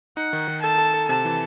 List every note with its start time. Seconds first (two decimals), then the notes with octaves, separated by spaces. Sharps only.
0.17 D#4 F#5
0.33 D#3
0.48 D#3
0.63 A4 A5
0.78 A4
0.94 A4
1.09 C3 A5
1.25 E3